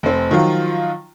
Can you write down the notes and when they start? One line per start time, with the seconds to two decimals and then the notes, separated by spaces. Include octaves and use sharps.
0.03 F1 C4
0.31 D#3 F3 F#3 F4